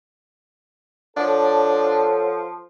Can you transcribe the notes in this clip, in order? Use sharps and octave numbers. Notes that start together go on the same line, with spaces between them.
F3 D4 A4 C#5 F#5